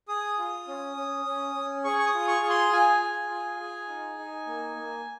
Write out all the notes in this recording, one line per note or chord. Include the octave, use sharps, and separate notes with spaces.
G#4 D#6
F4
C#4
C#4
C#4
C#4
G#4 C#6
C#6
D#6
F4
C#6
G#4
C6
F4 G#5
G#4
F4
G#4
D#4
D#4
A#3
A#3